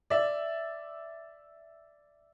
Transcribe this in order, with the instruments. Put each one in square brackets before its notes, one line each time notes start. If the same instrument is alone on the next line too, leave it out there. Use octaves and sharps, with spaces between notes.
[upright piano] D5 E5